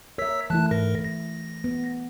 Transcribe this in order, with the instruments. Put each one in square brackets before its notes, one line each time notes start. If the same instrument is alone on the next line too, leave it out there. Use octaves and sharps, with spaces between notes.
[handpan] A#4 E5 [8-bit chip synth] C#5 E6 B6
[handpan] E3 A3 E4 [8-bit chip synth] A5 F#6
[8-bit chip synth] G#2 A#4 A#6
A#6
[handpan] B3